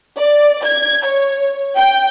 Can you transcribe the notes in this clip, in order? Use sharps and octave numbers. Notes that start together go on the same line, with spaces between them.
D5
G#6
C#5
G5